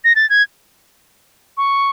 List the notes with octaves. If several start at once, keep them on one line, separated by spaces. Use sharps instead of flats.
A#6
A6
G#6
C#6